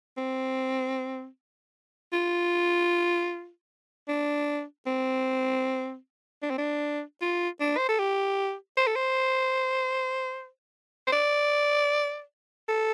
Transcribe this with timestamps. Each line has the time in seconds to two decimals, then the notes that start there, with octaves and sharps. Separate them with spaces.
0.17 C4
2.13 F4
4.08 D4
4.86 C4
6.42 D4
6.50 C4
6.58 D4
7.21 F4
7.60 D4
7.77 C5
7.88 A4
7.99 G4
8.77 C5
8.87 A4
8.96 C5
11.07 C5
11.12 D5
12.68 A4